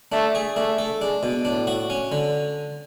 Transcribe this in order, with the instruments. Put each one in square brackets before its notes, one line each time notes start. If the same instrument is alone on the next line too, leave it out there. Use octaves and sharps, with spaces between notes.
[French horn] A3 [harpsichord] D4
[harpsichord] G#4
[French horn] A3 [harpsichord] D4
[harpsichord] A4
[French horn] G#3 [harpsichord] D4
[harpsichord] B2
[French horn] A2 [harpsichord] D4
[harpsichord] F#4
C#4
D3